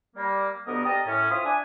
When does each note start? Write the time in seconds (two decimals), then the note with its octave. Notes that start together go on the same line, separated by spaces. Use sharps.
0.16 G3 A#3
0.67 D2 G2 B3 A#4 D#5 D#6
0.85 G4 A#4 D5 D#5
1.06 A2 C#4
1.31 C4 F4 E5 D#6
1.45 D4 G#5